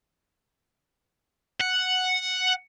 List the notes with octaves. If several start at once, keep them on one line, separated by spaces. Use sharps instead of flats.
F#5